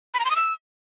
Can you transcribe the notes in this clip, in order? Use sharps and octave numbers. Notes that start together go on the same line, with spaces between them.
B5
A#5
C6
D#6
E6